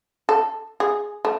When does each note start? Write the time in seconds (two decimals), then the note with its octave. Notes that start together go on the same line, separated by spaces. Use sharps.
0.29 A4
0.80 G#4
1.25 A3